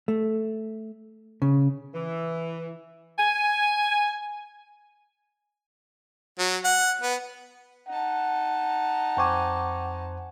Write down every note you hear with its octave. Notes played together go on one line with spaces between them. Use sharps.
A3
C#3
E3
G#5
F#3
F#5
B3
D#4 F#5 A5
F2 C5 G5 G#5 C#6 D6